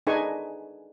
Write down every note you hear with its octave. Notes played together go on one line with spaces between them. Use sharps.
D4 D#4 G#4 B4 G#5 C#6